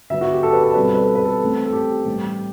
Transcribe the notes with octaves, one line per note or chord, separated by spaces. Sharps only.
D3 F#3 B3 E5
F#4
G4
A4
B4
A4
B2 G3 C4 B4
A4
B4
A4
B4
A4
E3 A3 C4
A4
G4
A2 E3 G3